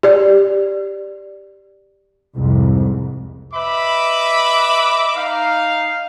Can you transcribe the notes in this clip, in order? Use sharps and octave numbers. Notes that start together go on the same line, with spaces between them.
G4 D5
C2 F2 G#2
B4 D#5 E5 B5 D6
D#4 F5